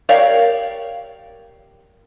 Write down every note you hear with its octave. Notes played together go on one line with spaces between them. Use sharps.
G4 A#4 C#5 D5 F5